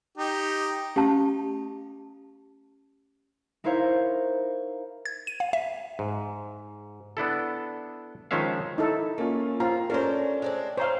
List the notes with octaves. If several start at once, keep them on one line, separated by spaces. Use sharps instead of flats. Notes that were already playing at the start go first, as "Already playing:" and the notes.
D#4 G4
A3 C#4 G4 F5 A5
D#4 E4 A#4 C5 C#5 F5
G#6
D#7
F5
E5
G#2
B3 D4 E4 A4
D#3 F3 G#3 C#4 E5 F5
D#4 E4 A4
A3 A#3 C#4 F4
C4 F4 A#5
A3 C#4 D4 A#4 C5 C#5
G#3 C4 D4
C4 C5 C#5 F5 A#5 F6